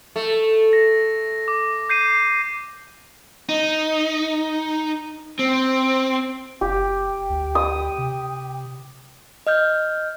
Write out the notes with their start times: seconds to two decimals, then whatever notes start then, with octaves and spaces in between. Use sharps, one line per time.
0.16 A3
0.73 A#6
1.48 D6
1.89 G6 C7 D#7
3.49 D#4
5.39 C4
6.61 F#1 G4 G5
7.30 D2
7.55 D#6
7.98 C3
9.47 D#5 F6 G6